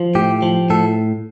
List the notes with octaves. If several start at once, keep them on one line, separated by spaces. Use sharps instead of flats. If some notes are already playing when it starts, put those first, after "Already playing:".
Already playing: F3
A2 G4
F3
A2 A4